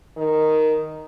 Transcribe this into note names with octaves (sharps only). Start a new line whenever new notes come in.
D#3